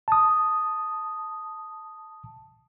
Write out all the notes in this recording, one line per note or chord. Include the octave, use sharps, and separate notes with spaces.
A5 D#6